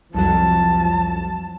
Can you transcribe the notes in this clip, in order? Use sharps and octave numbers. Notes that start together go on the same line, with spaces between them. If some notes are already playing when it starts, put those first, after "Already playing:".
C2 F2 F3 F#3 A5